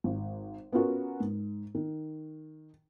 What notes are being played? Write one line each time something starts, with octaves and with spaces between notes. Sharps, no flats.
G#1
B3 C#4 F4 F#4 A#4
G#2
D#3